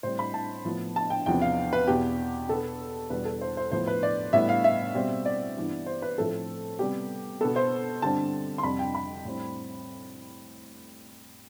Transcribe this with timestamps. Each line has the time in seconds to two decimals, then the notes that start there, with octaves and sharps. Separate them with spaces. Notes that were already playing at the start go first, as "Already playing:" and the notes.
0.03 A2 G3 C4 C5
0.19 B5
0.34 A5
0.65 A2 F3 B3
0.96 A5
1.10 G5
1.26 E2 C3 F3 B3 G5
1.42 F5
1.73 B4
1.87 E2 B2 B3 G4
2.49 B2 B3 A4
3.10 E2 B2 G3 B4
3.25 A4
3.41 C5
3.57 C5
3.72 A2 F3 B3 C5
3.87 B4
4.03 D5
4.33 A2 G3 B3 E5
4.49 F5
4.64 E5
4.95 B2 G3 C4
5.26 D5
5.57 G2 E3 B3
5.86 C5
6.02 B4
6.18 A2 F3 A3 C4 A4
6.79 C3 G3 B3 G4
7.41 B2 B3 A4
7.56 C5
8.02 G2 D3 G3 C4 A5
8.58 C6
8.63 F2 C3 G3 B5
8.79 G5
8.95 B5
9.25 A2 G3 C4